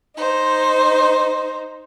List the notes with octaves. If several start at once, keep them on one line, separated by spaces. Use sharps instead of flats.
D#4 C5